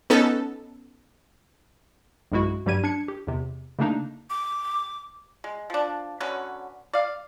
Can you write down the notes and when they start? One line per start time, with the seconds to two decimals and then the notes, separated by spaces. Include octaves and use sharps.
0.10 B3 C#4 D#4 A4
2.32 B1 G2 G#3 E4 F#4
2.66 G2 F#3 G3 G4 G#6 D#7
2.84 D4 G#6 C#7
3.08 G4
3.27 E2 C3
3.79 C#3 A3 A#3 D4 D#4
4.30 D6
5.44 G#3
5.70 F3 D4
6.20 D3 F#3 C#4 B4
6.93 D5 F5